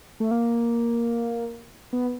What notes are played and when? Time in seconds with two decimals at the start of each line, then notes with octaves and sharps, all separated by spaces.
0.20 A3
0.31 A#3
1.93 B3